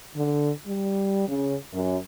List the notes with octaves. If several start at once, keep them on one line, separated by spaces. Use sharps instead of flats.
D3
G3
C#3
F#2